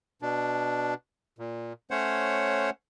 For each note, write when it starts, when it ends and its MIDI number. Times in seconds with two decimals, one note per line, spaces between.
0.22 0.94 47
0.22 0.94 62
1.39 1.73 46
1.91 2.70 57
1.91 2.70 61
1.91 2.70 72
1.91 2.70 73
1.91 2.70 78